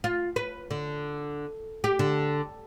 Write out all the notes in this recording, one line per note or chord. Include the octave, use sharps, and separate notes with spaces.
F4
B4
D3
G4
D3